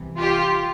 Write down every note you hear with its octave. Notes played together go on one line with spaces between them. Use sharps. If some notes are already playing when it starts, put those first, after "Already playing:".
Already playing: C2 C3 E3
F4 G4